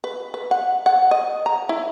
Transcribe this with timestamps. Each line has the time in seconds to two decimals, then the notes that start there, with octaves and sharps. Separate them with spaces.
0.04 B4
0.34 B4
0.51 F#5
0.86 F#5
1.11 D#5
1.46 A#5
1.69 E4